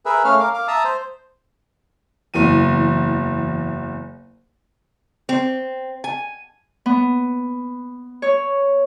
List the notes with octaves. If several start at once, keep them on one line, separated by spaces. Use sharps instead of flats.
G#4 A#4 B4 E5
A3 C#4 C#5 F5 F6
A#4 F5 D6
F5 D6
E5 A5 A#5 D#6
C5
F#1 E2 D#7
C4
G#5
B3
C#5